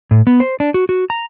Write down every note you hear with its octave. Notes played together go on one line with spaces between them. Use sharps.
A2
B3
C5
D4
F#4
F#4
A#5